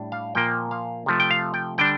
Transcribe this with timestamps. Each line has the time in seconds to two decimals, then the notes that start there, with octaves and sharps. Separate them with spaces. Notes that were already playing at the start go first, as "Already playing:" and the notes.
Already playing: A2 G3 D4
0.12 F5
0.35 A#2 F3 A#3 G5
0.71 F5
1.06 C3 F3 A3
1.20 G5
1.31 F5
1.54 G5
1.78 D3 G3 D4 G5